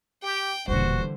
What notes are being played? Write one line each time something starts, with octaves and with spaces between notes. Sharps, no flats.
G4 G5
E1 A#2 D3 E3 G3 F#4 C5